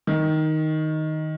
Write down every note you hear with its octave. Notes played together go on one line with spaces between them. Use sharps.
D#3